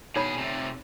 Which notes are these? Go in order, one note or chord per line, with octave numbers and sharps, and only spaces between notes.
B2 D#4 G#4 C#5 B5
C3 A3